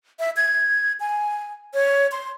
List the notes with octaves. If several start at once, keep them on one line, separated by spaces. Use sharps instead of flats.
E5
G#6
G#5
C#5
C6